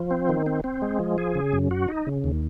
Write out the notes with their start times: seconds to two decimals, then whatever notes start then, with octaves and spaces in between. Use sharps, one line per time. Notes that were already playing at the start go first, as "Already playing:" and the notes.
Already playing: F3
0.11 C4
0.29 D#3
0.46 C4
0.64 C4
0.82 G#3
1.00 F3
1.18 G#4
1.35 C#3
1.53 F#2
1.71 F#4
1.88 D#4
2.07 C#3
2.24 D#2